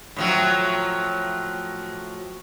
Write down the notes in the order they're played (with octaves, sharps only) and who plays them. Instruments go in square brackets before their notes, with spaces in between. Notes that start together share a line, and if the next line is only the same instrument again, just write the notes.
[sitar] A2 F3 F#3